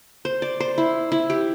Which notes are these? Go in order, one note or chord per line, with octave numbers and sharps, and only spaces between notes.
C5
D5
C5
E4
E4
G4